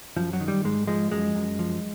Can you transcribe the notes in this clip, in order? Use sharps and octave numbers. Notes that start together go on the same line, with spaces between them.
F#2 F3
F#3
D#3
G3
G#2 G#3
F3 G#3
F#2 G#3
F#2
F3